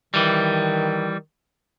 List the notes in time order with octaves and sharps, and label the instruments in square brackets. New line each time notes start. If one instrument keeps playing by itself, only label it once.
[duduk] D#3 [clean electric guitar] E3 G3